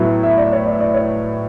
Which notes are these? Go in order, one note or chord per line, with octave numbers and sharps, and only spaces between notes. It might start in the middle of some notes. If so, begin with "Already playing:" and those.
Already playing: A2 F#3 B3
E5
D5
C#5
D5
D5
C#5